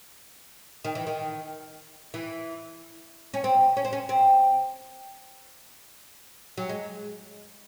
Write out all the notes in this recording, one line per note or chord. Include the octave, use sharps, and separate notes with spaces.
D#3
E3
D#3
E3
C#4
C4
C#4
C4
C#4
C4
F#3
G#3